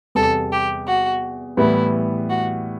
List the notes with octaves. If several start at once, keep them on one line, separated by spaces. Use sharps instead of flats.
E2 C3 G3 A4
G4
F#4
A2 E3 G3 B3 E4
F#4